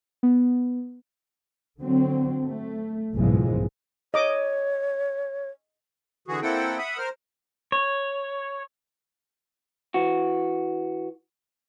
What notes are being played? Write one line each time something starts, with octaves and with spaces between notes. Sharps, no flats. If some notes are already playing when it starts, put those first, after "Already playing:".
B3
D3 F#3 C4
A3
F#1 B1 G#2 E3 F3 G#3
C#5 D#5 D6
D3 E3 F#4 G#4
A#3 C4 E4 A4 F#5 G5
E5 F#5 B5 D#6
A#4 C5 F6
C#5
E3 F#4